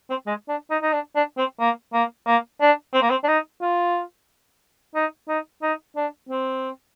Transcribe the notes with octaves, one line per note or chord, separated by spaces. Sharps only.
C4
G#3
D4
D#4
D#4
D4
D4
C4
A#3
A#3
A#3
D4
C4
A#3
C4
D4
D#4
F4
D#4
D#4
D#4
D4
C4